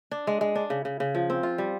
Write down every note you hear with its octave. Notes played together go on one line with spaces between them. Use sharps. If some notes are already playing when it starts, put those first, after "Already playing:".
D4
G#3
G#3
D4
C#3
C#3
C#3
F3
C4
F4
G3